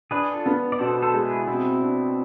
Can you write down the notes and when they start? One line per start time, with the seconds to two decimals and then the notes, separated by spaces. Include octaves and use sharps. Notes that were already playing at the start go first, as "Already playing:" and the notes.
0.11 D4 G#4 B4
0.33 F4 A4
0.46 B3
0.72 D5
0.79 B2 A4 C5
1.02 A4 C5
1.14 G#3
1.25 E4 G#4
1.47 B2 C4 E4
1.82 D4